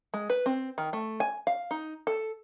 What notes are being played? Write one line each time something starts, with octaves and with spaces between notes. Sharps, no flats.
G#3
B4
C4
D#3
A3
G#5
F5
D#4
A4